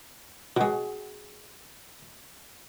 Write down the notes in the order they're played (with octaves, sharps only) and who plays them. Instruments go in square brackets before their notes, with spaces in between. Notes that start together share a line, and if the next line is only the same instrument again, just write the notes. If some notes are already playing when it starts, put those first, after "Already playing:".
[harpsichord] B2 G#3 [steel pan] F#4 G#4